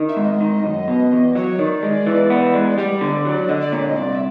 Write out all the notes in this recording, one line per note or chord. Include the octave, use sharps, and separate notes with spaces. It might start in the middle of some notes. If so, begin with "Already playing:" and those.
Already playing: D#3
E5
G#2
D#5
D#3
F#2
B2
E2
F#3 C#5
D#3 D5
G#3
E3
B3
G#3
G3 D5
D3
F#3
D3 D#5
D5
A#2 C#5
D#5
C2 D5
E5